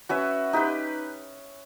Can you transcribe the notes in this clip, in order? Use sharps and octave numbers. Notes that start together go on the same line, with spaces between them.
C#4 F#4 B4 E5
D#4 G4 B4